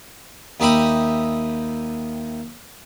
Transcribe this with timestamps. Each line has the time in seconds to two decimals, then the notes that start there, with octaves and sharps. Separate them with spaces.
0.60 D#2 D#4 G4 E5 B5 D#6